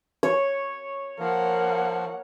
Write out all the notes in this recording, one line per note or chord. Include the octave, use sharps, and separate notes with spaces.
C#5
F3 A#3 F#5